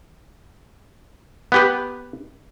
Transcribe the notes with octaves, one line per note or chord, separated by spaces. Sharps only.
B3 G4 B4